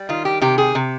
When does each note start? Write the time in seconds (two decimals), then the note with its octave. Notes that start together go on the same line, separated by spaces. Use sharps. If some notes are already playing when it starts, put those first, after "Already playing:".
Already playing: G3
0.09 D#3 F4
0.25 G4
0.41 C3 G4
0.58 G#4
0.75 C3